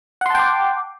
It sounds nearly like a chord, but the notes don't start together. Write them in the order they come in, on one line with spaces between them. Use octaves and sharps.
F#5 C6 A5 G5 D6